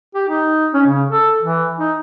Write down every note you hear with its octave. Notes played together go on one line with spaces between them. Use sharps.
G4
D#4
C#4
C#3
A4
E3
D#4